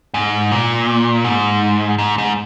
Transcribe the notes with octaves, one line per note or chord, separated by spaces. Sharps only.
G#2
A#2
G#2
G#2
G#2